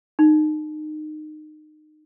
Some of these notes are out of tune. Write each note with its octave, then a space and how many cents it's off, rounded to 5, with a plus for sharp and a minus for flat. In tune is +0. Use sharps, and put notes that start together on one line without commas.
D#4 -25